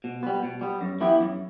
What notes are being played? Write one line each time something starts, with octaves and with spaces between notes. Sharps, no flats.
B2
G3 B3
B2
G3 B3
F#2
E3 B3 E4 G4
F#2